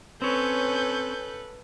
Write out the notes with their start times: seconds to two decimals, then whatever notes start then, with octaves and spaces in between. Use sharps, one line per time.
0.22 C4 C#4 A4 B4 C#5 G6